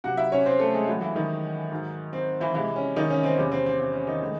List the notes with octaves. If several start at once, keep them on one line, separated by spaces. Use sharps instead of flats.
C3 F#3 F#4 F#5
E4 E5
C#4 C#5
C4 C5
A3 A4
G#3 G#4
A2 E3 F#3 G#3 F#4
E3 E4
E4
D#3 D#4
G#2 F#3
C4
E3 E4
C3 E3 G#3 E4
C#4
D#3 D#4
C#4
C4
E2 C3 E3 C#4
C4
C4
C4
C#4
D#3 D#4
A2 E3 G#3